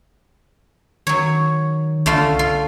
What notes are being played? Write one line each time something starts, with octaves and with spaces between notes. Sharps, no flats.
D#3 F#3 C#5
C2 D3 A3 F4
F4